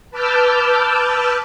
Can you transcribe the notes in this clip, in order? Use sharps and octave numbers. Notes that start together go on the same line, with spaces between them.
B4 A5 D6 E6 F6 G6